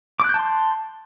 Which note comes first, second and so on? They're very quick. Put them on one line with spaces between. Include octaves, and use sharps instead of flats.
D6 F#6 G6 A5 C6